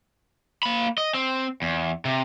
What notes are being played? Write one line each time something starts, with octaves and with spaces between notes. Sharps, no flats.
A#3 B5
D#5
C4
E2
C3